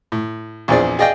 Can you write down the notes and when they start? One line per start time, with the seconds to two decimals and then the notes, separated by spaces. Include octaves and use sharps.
0.12 A2
0.68 A#1 E2 F3 C4 G#4 D5
0.99 G#4 D5 D#5 F5 G5